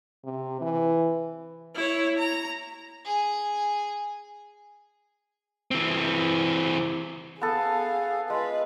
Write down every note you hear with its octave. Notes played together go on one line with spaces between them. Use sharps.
C3
E3
E4 C#5
A#5
G#4 G#5
E3 C4
B3 G#4 A4 F5
G#3 F4 B4